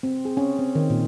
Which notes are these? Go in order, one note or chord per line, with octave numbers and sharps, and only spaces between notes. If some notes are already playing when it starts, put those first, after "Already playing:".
C4
G#4
C#4
C4
D#3
A#2